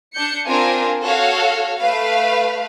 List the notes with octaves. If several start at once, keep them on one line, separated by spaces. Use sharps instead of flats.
D4 G6 C#7
C4 D4 F4 A#4 F5 G#5
F#4 A4 C#5 F5
A3 B4 F5